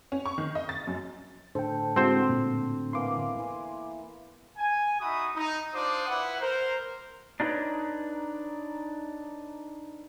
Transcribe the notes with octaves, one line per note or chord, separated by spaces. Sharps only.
C#4
C#6
D#3
D#5
A6
F#2
A2 D3 A4 C5 G5
G#3 C4 E4 F#4 C5
A#2
E3 A#3 B3 C6 D6
E3
G#5
D#4 F#4 E5 B5 D#6
D#4
D4 F4 C5 D6 D#6
E4 B4 F#5
A#4 C5
D4 D#4 F4 G#4 B4 C#5